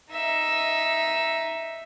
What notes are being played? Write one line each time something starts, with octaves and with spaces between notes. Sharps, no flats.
D#4 E5